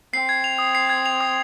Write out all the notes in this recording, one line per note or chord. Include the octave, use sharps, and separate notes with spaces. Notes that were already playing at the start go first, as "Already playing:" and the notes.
C4 C7
G#6
F7
D#6
C7
G#6
F7
D#6